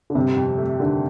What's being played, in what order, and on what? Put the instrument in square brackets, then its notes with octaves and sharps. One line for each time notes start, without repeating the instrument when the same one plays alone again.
[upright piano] D3
[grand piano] G1 [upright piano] C3
[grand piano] F2
A3
[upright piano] D3 [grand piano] D#3